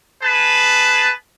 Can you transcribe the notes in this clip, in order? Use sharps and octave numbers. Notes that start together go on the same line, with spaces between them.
G#4 B4 A5